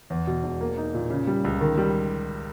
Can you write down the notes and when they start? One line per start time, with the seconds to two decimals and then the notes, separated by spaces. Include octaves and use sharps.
0.10 E2
0.27 B2
0.44 E1
0.61 A#3
0.77 D#4
0.94 A#2
1.10 C#3
1.27 G3
1.44 C#2
1.61 D#3
1.77 G3